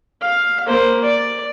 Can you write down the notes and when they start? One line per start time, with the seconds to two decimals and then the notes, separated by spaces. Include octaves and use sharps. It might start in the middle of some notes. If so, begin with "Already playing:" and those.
0.21 F5
0.67 A#3 C5
1.01 D5